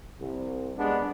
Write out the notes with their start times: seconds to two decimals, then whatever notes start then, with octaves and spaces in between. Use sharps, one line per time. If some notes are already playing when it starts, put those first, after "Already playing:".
0.20 C2
0.78 G3 G#3 B3 D4